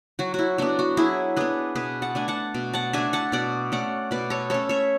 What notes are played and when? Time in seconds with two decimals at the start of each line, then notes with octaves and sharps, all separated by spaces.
0.19 F#3 F#4
0.34 E4 F#4
0.58 B3 D4 F#4
0.79 F#4
0.97 F#3 E4 G#4
1.36 B3 D4 G#4 B4
1.75 B2 G#4 B4
2.02 F#5 A5
2.15 A3 D4 G#5
2.28 F#5 A5
2.54 B2
2.74 F#5 A5
2.93 A3 D4 E5 G#5
3.13 F#5 A5
3.32 B2 D5 F#5
3.72 A3 C#4 D5 F#5
4.11 B2 B4 D5
4.30 A4 C#5
4.50 A3 C#4 A4 C#5
4.69 C#5 E5